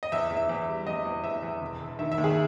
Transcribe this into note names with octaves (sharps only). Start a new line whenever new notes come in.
D#5
E2 E5
E2
E5
E2
G3
E2 D#5
E2
E2 E5
E2
E1
E1
D#3 E5
E5
D#2
G#4